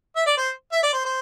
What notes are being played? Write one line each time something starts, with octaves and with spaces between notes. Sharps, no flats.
E5
D5
C5
E5
D5
C5
C5